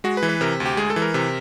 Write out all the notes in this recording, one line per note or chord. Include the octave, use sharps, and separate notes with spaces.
G#3 F#4
B4
E3
B4
C3 A#4
D2
G4
G#3 G#4
A4
E3
A#4
C3